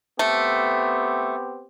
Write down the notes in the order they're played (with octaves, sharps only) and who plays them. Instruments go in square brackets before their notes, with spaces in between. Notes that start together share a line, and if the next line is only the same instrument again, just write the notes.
[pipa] A3 A4 [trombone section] B3 C4 G4